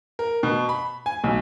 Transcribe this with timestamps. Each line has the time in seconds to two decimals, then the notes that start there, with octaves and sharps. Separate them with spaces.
0.19 A#4
0.43 B2
0.69 B5
1.06 G#5
1.24 B1